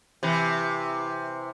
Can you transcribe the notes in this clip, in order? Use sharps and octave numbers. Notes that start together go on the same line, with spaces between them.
C3 E3